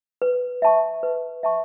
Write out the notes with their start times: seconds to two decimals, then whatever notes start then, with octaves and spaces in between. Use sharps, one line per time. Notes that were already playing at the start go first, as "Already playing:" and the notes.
0.22 B4
0.62 E5 A5 C#6
1.03 B4
1.43 E5 A5 C#6